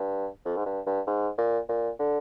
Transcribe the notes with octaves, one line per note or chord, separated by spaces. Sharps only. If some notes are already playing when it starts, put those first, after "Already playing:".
Already playing: G2
F2
G#2
G2
G2
G#2
A#2
A#2
D3